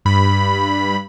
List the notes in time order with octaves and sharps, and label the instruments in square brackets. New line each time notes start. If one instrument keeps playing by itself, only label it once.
[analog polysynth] G2 B5